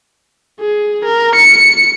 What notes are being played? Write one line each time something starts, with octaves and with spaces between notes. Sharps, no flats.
G#4
A#4
C#7